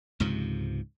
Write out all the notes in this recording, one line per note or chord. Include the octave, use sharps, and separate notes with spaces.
C#2 G#2 C3 F3